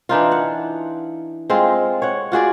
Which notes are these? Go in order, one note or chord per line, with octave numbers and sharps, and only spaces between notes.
E3 D4 D#4 F4
F#5
G#3 C4 F4
C#5 F#5
F4 F#4 G#4 D5